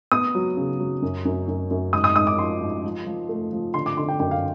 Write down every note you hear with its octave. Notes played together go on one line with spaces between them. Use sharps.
B3 D#6
F#3
C#3
F#3
F#2
F#2
F#2
F#2
G#2 D#6
D#6
G#2 D#6
D6
F3 C6
G#2
F3
F3
A3
F3
D3 C6
D6
D3 C6
G5
F#2 G5
F5